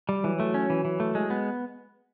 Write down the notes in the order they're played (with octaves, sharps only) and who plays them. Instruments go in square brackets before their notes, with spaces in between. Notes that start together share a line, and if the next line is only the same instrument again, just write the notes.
[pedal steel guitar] G3
[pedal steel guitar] E3 [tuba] F#3
[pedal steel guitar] A3
C#4
E3
E3
A3
G#3
B3